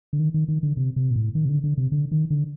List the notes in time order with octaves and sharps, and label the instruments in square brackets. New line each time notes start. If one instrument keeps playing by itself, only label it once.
[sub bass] D3
D#3
D#3
D#3
D3
C3
C3
A#2
A2
D#3
C3
D3
D3
C3
D3
D#3
D3